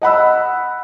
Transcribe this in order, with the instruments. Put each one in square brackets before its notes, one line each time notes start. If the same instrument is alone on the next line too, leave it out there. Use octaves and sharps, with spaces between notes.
[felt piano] D#5 F#5 B5 E6